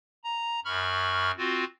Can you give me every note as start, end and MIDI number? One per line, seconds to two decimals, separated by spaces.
0.24 0.60 82
0.65 1.31 42
0.65 1.31 83
0.65 1.31 85
0.65 1.31 89
1.38 1.64 60
1.38 1.64 65
1.38 1.64 66